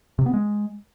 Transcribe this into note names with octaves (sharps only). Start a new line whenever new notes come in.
C3
B3
G#3